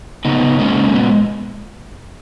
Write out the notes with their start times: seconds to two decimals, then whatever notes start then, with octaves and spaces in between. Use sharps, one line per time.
0.25 C#3 B3 D#4
0.43 C#3
0.59 G#3 A#3 C#4
0.76 G#3
0.89 C#4
0.93 A#2 B3